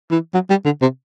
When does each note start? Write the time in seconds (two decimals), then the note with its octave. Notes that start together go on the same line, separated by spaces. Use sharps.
0.11 E3
0.34 F#3
0.50 G3
0.65 D3
0.82 C3